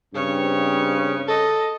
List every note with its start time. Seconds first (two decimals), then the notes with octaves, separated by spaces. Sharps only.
0.15 G2 C#3 C4 C#5
1.28 A4 D#5